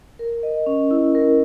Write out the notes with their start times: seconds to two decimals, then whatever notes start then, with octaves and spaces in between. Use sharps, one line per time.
0.19 A#4
0.43 D#5
0.66 C#4
0.91 E4
1.15 A#4